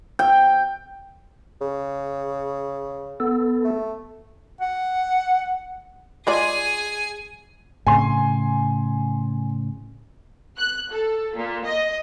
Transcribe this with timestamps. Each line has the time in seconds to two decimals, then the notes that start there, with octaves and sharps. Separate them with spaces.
0.19 G5
1.61 C#3
3.20 B3 A4
3.65 A3
4.61 F#5
6.27 G#3 F4 G#4 D5 G#5
7.87 A2 C#3 G#5 C6
10.57 F#6
10.91 A4
11.35 A#2
11.65 D#5